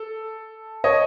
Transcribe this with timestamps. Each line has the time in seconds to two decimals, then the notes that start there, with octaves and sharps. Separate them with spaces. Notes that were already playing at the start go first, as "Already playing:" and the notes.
Already playing: A4
0.84 C#5 D#5